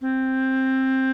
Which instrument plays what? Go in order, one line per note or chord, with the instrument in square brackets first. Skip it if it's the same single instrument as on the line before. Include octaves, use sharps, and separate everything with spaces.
[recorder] C4